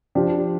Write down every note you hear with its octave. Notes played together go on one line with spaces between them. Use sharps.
F3 D4 G4